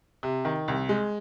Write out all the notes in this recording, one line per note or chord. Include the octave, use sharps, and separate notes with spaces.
C3
D#3
C2
G#3